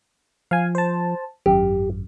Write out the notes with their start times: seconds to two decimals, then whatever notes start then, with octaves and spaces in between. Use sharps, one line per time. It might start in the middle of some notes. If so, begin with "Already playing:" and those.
0.51 F3 F5 G#5
0.75 C5 A5
1.46 G#1 F#2 G4